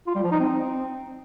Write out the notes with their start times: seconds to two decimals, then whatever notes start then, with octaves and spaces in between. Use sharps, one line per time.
0.07 F4
0.15 G3
0.23 F3
0.32 D#4
0.40 C4